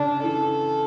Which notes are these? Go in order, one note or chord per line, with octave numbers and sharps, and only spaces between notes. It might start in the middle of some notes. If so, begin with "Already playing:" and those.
Already playing: C#3 D4
E3 A4